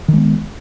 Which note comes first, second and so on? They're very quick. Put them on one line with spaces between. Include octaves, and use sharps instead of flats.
D#3 G#3 B3